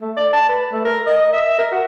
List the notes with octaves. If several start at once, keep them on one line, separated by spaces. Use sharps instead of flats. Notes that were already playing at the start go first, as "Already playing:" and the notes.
A3
D5
A5
B4
A3
A#4
D#5
E5
A#4
F#4